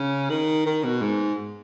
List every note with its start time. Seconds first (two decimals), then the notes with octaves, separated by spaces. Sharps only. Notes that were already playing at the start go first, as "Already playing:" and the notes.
Already playing: C#3
0.30 D#3
0.66 D#3
0.84 B2
1.02 G#2